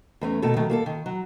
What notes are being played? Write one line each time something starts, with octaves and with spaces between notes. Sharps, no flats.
E2 A3 C#4
B2 D#3 A3 A4
D#3 F#3 A3
A#3 G#4 A4
D#3
F#3